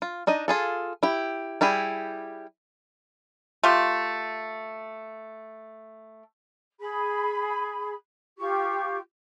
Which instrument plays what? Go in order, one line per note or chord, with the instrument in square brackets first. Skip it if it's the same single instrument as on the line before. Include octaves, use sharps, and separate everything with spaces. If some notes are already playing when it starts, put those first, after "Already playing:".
[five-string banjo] F4
D4 D#4 D#5
F4 G#4 A4
E4 G4
G3 E4 G4 G#4
[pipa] A3 F4 G4
[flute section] G#4 B5
F4 G4 C#6